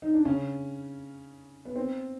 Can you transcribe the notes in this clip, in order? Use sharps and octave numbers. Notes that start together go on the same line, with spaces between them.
D#4
D4
C#3 C#4
B3
C4